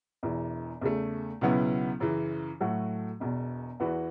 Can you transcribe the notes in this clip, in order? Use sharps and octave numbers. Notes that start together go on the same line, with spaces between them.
E1 E2 E3
E2 C#3 A3
C#2 B2 F#3 B3 E4
F#2 C#3 E3
A2 F#3 A3 F#4
E1 E2 B2
E2 E3 B3 F#4